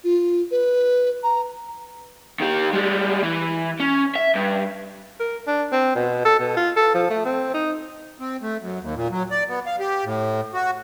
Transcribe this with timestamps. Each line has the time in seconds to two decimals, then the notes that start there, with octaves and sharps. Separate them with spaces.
0.04 F4
0.51 B4
1.23 A#5
2.40 D#3 G4
2.74 G3 G#3
3.23 E3
3.80 C#4
4.16 E5
4.36 G2
5.20 A#4
5.47 D4
5.72 C4
5.95 B2
6.25 A4
6.40 B2
6.57 F4
6.76 A4
6.94 F3
7.10 A3
7.25 C4
7.54 D#4
8.19 C4
8.42 A3
8.60 F#2
8.81 D#2
8.95 A#2
9.11 F#3
9.31 D5
9.49 B3
9.66 F5
9.79 G4
10.05 A2
10.54 F#4